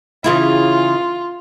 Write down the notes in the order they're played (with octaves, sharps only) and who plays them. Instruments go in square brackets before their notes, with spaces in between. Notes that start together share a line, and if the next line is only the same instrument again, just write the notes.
[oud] C#3 E3 E4 [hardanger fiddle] F4